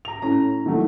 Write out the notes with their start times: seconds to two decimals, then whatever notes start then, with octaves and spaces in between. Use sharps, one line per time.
0.05 A#5 F7
0.22 A2 C#4 A#5
0.66 D#3 E3 F#3 A3